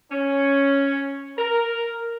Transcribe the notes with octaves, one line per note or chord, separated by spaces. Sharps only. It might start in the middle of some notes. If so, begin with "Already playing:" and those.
C#4
A#4